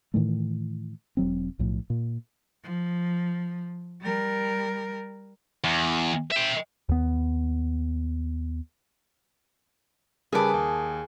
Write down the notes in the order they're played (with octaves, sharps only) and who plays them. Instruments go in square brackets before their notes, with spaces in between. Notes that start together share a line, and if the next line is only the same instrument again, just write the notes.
[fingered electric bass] A2 D#3 E3 A3
E1 F#3 C4
B1 A2 F3
A#2
[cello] F3
G3 A#4
[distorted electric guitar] E2
E5 G5
[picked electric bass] D#2 B3
[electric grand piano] C#3 G3 B4 [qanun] G#4 D6 [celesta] A#4 A5
[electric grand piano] D#2